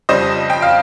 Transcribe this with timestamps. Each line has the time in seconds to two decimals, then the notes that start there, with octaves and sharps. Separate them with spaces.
0.09 F2 C#3 G3 C5 D#5
0.50 G5
0.62 F5